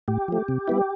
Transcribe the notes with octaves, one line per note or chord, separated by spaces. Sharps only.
A2 G4
F3 A3
C3
G3 B3 E4